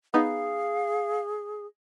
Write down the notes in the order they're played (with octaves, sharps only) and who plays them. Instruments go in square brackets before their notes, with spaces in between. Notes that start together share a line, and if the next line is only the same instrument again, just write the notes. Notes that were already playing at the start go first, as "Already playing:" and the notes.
[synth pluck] B3 D#4 [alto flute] G#4 [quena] F5